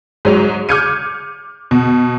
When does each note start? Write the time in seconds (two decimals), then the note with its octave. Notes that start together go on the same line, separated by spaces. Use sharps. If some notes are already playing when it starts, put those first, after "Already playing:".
0.25 G#2 F#3 F7
0.69 D6 F6 G6 G#6 C#7 D#7
1.71 B2